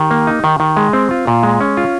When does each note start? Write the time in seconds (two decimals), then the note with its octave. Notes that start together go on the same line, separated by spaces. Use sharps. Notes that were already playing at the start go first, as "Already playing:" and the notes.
Already playing: D#3 G4
0.11 A#3
0.27 D#4
0.44 D#3
0.60 D#3
0.77 G#3
0.93 C4
1.11 F4
1.27 A#2
1.43 G#3
1.61 C#4
1.77 F4